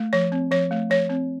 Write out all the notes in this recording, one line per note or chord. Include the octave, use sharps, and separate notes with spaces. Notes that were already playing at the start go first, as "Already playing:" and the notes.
Already playing: A3
F3 C#5
C4
F3 C#5
A3
F3 C#5
C4